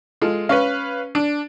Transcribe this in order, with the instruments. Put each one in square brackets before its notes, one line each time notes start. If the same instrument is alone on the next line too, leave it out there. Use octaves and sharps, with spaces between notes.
[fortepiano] G#3 F4 A4
[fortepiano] C#4 [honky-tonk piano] B4 C#5 F5
[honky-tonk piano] D4